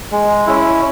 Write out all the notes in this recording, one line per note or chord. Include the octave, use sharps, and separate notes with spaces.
G#3
C#4 E4